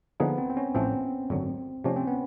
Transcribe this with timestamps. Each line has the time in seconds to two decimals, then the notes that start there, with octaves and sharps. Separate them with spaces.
0.20 D3 F3 A#3 B3 D#4 G#4
0.38 C4
0.50 C4
0.57 C#4
0.74 A1 A2 F3 A3 C4 C#4
1.30 G#1 F#2 D3 F#3
1.84 C3 F3 A3 C#4 D4 G4
1.96 C4
2.07 B3